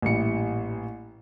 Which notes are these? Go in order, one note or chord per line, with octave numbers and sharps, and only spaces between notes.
A1 A#2 G3 E4 C#7